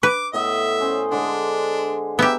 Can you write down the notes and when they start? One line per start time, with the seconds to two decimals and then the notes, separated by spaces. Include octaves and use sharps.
0.03 B4 D6
0.33 A2 B3 D#5 E5
0.80 C#4 C5
1.11 D3 G#3 D4
2.19 B3 G4 E5 A#5